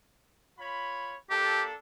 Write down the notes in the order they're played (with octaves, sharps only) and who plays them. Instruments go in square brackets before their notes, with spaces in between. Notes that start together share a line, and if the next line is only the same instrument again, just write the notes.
[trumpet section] F4 C#5 B5
[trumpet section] A#3 D4 A4 [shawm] G4